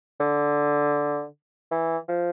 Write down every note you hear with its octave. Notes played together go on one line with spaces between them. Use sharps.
D3
E3
F3